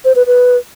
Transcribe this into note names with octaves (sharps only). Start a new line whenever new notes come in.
C5
B4
B4